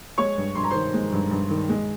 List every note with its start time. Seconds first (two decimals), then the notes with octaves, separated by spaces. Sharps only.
0.18 G#3 C#5 C#6
0.37 G2
0.55 G2 C6
0.64 A#5
0.71 D#3 C5 C6
0.94 G#3
1.12 G2
1.31 G2
1.51 D#3
1.69 G#3